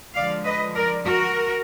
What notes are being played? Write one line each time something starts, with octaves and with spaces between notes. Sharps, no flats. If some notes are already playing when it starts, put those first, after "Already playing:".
D3 F3 G#3 D5 F5
B4 D#5
A#4 D5
F#4 A#4